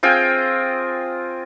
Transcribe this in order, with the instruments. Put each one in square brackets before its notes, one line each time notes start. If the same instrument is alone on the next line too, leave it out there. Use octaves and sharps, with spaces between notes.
[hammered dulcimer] C4 F4 G#4 G5